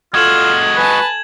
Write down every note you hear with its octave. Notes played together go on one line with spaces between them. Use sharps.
G#3 F4 F#4 A4 G#6 E7 F#7
B4 G#5 A5